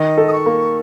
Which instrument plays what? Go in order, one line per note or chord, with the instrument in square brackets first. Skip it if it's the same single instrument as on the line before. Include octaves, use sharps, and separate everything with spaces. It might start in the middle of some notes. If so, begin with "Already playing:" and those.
Already playing: [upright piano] D#3 [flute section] D#5
[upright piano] A4
[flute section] D#6
C#6
[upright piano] A#3